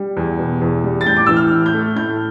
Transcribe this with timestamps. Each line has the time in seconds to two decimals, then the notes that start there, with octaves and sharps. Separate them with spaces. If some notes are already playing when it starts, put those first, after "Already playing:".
Already playing: G3
0.17 E2
0.39 B2
0.61 E2
0.84 G3
1.01 A6
1.06 A2 G6
1.17 D6
1.26 E3 E6
1.36 F6
1.51 A2
1.66 G6
1.74 A3
1.96 A2 G6